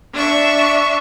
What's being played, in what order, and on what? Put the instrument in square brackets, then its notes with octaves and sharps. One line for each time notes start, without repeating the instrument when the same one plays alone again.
[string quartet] D4 E5 C#6